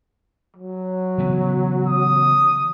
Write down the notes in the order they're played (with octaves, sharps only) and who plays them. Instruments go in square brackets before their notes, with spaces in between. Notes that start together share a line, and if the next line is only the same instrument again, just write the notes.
[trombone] F#3
[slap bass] C#3 E3 B3
[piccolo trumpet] D#6